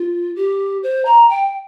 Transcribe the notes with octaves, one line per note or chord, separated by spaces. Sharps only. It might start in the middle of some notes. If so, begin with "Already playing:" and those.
Already playing: F4
G4
C5
A#5
G5